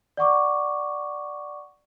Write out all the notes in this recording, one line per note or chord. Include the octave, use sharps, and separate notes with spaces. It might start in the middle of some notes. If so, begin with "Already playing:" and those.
D5 F#5 C#6 D6